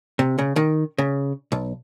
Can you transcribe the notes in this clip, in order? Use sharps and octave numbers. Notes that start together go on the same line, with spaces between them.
C3
C#3
D#3
C#3
B1